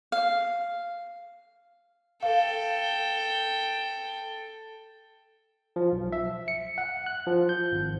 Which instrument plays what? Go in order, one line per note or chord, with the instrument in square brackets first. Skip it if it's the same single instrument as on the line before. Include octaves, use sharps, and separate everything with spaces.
[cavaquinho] F5
[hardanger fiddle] A4 G5 [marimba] F5
[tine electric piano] F3
B1
E5
C#7
F#5
F#6
F3
G6
G#1